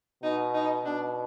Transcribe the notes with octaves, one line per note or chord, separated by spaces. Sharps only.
B2 D#4
D#4
B2 D4